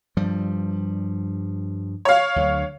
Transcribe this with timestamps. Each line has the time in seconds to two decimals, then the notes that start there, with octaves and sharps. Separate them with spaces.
0.17 G2 F3 G3
2.05 C#5 F5
2.36 D2 D3 F#3